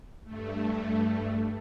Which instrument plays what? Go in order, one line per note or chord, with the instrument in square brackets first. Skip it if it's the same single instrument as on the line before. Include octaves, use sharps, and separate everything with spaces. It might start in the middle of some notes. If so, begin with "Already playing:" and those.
[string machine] G2 A3